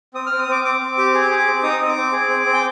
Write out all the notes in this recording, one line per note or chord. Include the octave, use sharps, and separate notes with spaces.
C4 D#6
C4 F6
D#6
C4 D6
C4 D6
C4
G4
G#4
G#4
C4
D#4 D#6
C4
D6
C4
G#4
C4
C4
G5